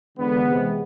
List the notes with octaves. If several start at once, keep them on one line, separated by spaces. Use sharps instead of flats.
E2 D3 G#3 B3
E2 C3 G#3